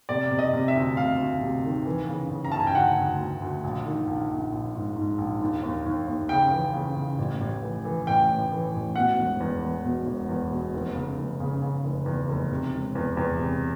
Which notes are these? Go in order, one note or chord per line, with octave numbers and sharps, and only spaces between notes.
C3 D5
C3
D#5
C3
E5
D2
C3 F5
D2
C3
D#3
E3
C#3
C#3
A#5
C#3 A5
G#5
G5
D2 F#5
D2
D2
D2
A#1
D#3
A#1
A#1
A#1
G#2
G#2
A#1
D#2
D#2
D#2
D#2
C#3 G5
E3
C#3
C#3
A1
A1
E3
E3
A1 G5
A2
E3
A1
B2 F#5
E1
E2
E2
B2
E1
E2
B2
F1
C#3
F1
C#3
C#3
F1
E2
F1
C3
E1
E2
E2
C3